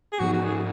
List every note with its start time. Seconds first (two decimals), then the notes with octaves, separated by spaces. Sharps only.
0.13 G#4
0.19 G#2 F3 B3 F#4
0.33 F#4
0.45 G#4